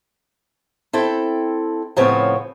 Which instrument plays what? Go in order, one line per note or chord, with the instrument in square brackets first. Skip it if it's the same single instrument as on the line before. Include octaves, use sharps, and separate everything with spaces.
[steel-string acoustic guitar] C4 E4 A4 G5
A2 C#3 F3 B3 C4 C#5